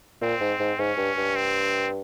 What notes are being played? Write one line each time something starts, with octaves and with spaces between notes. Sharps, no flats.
A#2 C4
G#2
G#2
G#2 C#4
G2
G2
C4